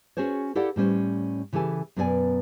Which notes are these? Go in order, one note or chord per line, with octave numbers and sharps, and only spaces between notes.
C#4 F#4 G#4 C5 C#5
E4 G4 A4 D5 F5 F#5
A2 G3 C#4 C5
C#3 E3 G4 A4 G#5
F#2 B2 B3 F#4 D5 G#5